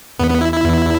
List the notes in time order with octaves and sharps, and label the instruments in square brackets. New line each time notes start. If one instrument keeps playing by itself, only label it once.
[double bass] E2 [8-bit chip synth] B3
[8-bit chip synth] B3
E4
E4
[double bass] E2